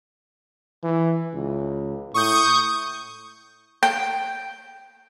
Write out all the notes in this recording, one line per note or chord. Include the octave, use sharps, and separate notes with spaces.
E3
C#2
A2 C#6 D#6 G6
G5